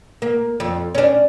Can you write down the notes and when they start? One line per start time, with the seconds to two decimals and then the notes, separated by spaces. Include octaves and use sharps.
0.22 A#3
0.60 F2
0.95 C#4 D4